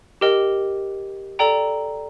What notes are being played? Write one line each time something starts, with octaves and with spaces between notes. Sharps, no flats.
G4 A#4 D#5 G5
A4 D5 G5 A#5